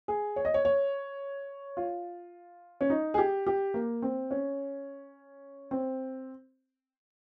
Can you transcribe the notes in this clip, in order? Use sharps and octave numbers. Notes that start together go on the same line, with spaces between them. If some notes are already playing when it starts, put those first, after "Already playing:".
G#4
C#5
D#5
C#5
C#5
F4
C#4
D#4
G#4
G4
G4
A#3
C4
C#4
C4